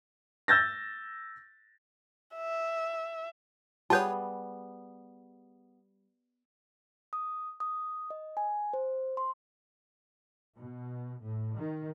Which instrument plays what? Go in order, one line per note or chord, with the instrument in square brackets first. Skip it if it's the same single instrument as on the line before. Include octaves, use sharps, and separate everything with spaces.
[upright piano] E6 G6 A6 A#6
[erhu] E5
[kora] G3 B3 G#4 [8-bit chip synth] F4 B4 C#5 [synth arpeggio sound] A5 G6
[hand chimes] D#6
D#6
D#5
G#5
C5
C6
[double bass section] B2
A2
D#3